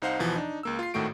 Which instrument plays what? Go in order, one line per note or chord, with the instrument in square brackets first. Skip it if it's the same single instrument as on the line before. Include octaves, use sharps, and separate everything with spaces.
[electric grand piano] C2 D#4 C5 F5 F#5
E2 B2 E3 F3
D4 D#4
C#2 A#3 E6
F4 C7
G#1 A2 D#3 A3 F#4 D7